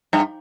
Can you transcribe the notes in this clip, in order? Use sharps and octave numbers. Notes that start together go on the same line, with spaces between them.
G2